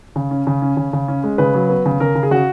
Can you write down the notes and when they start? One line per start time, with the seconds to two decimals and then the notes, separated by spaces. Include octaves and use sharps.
0.16 C#3
0.31 C#4
0.47 C#3
0.62 C#4
0.77 C#3
0.93 C#3
1.08 C#4
1.24 G#3
1.38 C#3 B4
1.54 F#3
1.69 B3
1.86 C#3
2.00 C#3 A#4
2.15 C#3
2.23 G#4
2.31 C#3 F#4